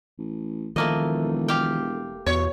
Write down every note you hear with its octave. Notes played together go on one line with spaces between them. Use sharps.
A1
E1 D#3 F3 A3 A#3 D#5
G4 F5 G5
E2 B2 C#5